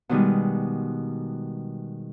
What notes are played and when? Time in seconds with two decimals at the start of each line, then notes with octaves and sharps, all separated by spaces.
0.09 B2 D#3 G3 G#3